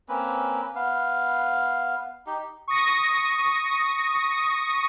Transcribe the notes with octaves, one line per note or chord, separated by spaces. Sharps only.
A#3 C4 C#4 B4
B3 F5
D#4 G4
C#6 D#6 A#6